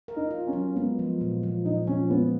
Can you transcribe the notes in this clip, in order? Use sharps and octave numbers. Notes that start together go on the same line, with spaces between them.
A#4
D#4
F4
C#4
F#3
G#3 B3
F3
A#2
F3
A#2 D#4
F3 C#4
G#3 B3